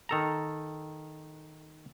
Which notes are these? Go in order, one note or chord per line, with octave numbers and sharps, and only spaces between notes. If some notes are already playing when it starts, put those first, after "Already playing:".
D#3 A4 A#5